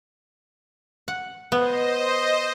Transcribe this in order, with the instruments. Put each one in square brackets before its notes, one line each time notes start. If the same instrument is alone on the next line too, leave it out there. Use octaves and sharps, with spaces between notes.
[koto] F#5
[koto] B3 [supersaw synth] C5 D#5